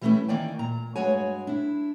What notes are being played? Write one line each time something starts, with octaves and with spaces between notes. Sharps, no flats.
E3 G3 A3 C4 C#4 E4
D#3 E3 A#3 D5 G5 G#5
A#2 A#5
G2 G#3 F#4 C#5 G#5
D4 E4